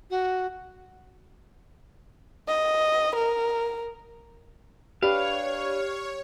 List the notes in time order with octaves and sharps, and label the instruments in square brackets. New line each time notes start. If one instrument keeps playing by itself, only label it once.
[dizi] F#4
[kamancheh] D#5
A#4
[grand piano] D4 B4 [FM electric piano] G4 [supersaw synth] C#5 [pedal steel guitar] F5